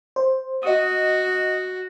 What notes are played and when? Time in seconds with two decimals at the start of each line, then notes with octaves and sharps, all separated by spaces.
0.16 C5
0.63 F#4 D#5 D#6